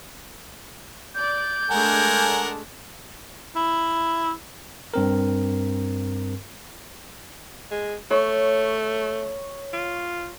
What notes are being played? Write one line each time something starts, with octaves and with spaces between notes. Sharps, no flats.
D5 G6
G#3 A3 D4 A#4 F#5 G#5
E4
G2 C4 A#4
G#3
A3 C#5
F4